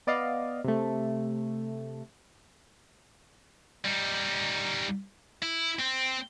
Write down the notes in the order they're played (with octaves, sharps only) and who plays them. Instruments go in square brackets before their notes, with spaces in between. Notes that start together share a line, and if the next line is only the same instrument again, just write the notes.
[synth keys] B3 D5 D#5 F5
C3 A3
[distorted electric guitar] G3 D#4
E4
C4